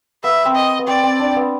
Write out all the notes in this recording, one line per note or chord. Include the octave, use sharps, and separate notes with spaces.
B3 E5
C4
D#5
B3
C4 D5
C4
D4
B3